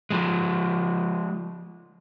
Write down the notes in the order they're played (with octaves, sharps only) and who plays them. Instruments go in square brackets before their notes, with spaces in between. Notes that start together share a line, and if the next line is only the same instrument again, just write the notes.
[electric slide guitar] F3 G#3